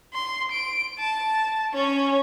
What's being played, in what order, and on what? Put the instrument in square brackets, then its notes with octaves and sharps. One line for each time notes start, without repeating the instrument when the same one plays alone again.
[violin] C6
D7
A5
C#4 C#5